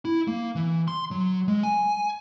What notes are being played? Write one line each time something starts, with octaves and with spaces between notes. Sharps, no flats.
E4
A#3
E3
C6
F#3
G#3
G#5